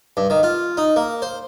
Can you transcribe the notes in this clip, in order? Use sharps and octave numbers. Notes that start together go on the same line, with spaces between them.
G2
D#3
F4
D#4
A#3
C5